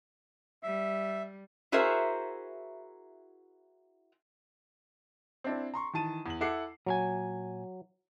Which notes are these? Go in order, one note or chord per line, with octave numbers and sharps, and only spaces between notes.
G3 E5
E4 F#4 G#4 A#4 C5 E5
C4 D4 E4
A#5 C6 C#6
D#3 E3 A5 D#7
E2 F#7
E4 A4 F#5 D6 C7
A#2 F#3 A#4 G#5